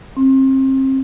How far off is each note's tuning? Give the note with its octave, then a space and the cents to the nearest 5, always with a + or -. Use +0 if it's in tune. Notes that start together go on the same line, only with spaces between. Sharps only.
C4 +30